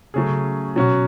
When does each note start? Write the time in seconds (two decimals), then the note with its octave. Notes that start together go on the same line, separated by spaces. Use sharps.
0.14 C#3 F#3 A3 C#4 G#4
0.76 B2 F#3 C#4 F#4